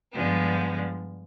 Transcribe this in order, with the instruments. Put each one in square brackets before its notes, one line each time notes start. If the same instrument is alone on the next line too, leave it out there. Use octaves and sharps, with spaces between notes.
[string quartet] G2 D3 F3 G#3 B3